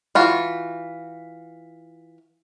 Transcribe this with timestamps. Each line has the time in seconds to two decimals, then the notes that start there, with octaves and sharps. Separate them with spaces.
0.15 E3 F4 F#4